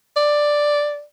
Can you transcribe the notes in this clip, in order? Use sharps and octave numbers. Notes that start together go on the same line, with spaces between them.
D5